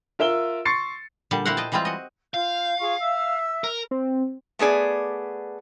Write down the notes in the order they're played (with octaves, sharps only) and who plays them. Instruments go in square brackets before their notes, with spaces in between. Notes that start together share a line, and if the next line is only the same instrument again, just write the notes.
[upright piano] F4 A#4 E5 E6 G7
C6 C#6 A6 C7 C#7
[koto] A#2 D3 G3 A5
A#3 E4 A#4 C5 F#5
D#5 G5 A5
E3 G3 G#3 C4 F4 C5
F#4 D#5
[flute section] F4 G6 [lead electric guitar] F5
[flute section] F4 G#4 C#6
E5 E6
[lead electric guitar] A#4
[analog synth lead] C4
[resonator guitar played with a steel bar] A3 B3 G#4 D5